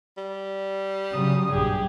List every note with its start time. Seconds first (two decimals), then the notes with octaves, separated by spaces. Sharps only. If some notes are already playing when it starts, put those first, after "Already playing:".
0.17 G3
1.13 C#3 F#3 D#6
1.52 A#1 G2 G4 G#4